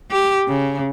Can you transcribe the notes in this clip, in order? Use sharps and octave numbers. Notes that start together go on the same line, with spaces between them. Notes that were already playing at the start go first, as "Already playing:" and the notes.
G4
C#3